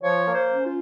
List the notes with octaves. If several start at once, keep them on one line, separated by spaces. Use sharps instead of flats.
F3 C#5
A#3
C5
C#4
F4